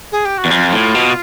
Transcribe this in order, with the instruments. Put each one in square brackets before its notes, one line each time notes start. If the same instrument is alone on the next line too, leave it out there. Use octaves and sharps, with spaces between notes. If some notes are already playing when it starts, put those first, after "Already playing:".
[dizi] G#4
G4
F#4
[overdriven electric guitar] E2
[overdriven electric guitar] F2 [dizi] F4
[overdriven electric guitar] A2
B2